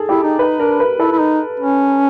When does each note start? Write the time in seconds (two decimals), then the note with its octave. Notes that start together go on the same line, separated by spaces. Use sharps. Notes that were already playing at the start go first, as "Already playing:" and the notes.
Already playing: G#4 A4
0.09 E4 G4
0.24 D#4
0.39 D#4 B4
0.59 D4 A#4
0.80 B4
0.99 E4 A4
1.12 E4
1.19 D#4
1.60 C#4